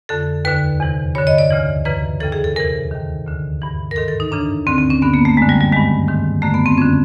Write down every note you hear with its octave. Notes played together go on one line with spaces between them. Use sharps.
F2 D3 A4
D#2 D3 B4
E2 C3 E3
G2 D3 C#5
D#5
D5
D2 C#3 E3
F#2 C#3 E3 B4
D#2 C#3 E3 A4
G#4
A4
E2 C3 E3 A#4
D#2 D#3
D2 D3
G2 E3
A#4
G#2 D#3 A4
A4
D#4
F#2 C#3 E3 D4
D2 D3 C4
C4
C#4
G2 D3 B3
A#3
A3
F#2 D3 G#3
G3
G3
G2 D#3 G#3
G#2 D#3
F#2 D3 A3
B3
C4
F2 D3 C#4